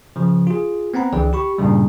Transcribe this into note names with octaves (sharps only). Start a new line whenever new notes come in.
C#3 F3
F4 G#4
B3 C4 F#5 A#5 B5
C#2 D3 E3 G#4 D5 G5
G4 B5 C#6
G2 A#2 C#3 G3